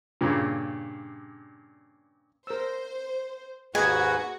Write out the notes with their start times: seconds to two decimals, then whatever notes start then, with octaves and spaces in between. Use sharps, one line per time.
0.21 G2 A#2 C#3
2.47 A#4 C5 E6
3.75 D#2 G#2 F#4 G#4 B4 D#5 G#5